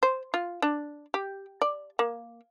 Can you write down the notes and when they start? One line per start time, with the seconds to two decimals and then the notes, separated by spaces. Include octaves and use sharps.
0.03 C5
0.34 F4
0.62 D4
1.14 G4
1.62 D5
1.99 A#3